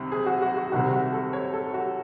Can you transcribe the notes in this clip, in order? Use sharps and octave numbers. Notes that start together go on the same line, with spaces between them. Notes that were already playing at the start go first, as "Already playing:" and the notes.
Already playing: C2 C3 D#3
G#4
F#4
F#4
F#4
C2 C3 D#3 F#4
F#4
A4
C#5
A4
F#4